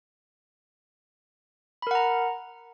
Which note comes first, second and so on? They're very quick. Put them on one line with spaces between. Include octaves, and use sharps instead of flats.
B5 A#4 F#5 A#5